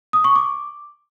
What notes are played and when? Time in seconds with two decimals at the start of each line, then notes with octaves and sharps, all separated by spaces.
0.13 D#6
0.24 C#6
0.36 D6